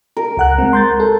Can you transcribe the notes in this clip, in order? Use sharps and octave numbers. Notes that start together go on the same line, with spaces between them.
A#4
C#2 F#5 F#6
G#3 C4
C6 G6 A6
A4